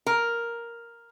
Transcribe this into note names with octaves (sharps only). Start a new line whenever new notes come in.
A#4